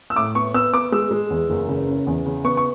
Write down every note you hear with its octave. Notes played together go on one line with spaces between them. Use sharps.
E6
A2 D6
B3 C#6
B3 E6
B3 D6
G#3 E6
G#3
E2
F#1
C#3
C#4
E2
C#3
B3 C#6
C#6